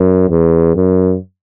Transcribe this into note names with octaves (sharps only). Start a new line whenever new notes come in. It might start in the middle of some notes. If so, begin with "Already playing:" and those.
Already playing: F#2
E2
F#2